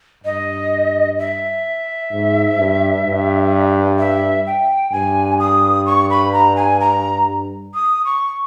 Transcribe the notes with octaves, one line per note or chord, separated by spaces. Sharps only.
G2 D#5
E5
G#2
G2
G2
E5
G5
G2 G#5
D#6
C#6
B5
A#5
G#5
A#5
D#6
C#6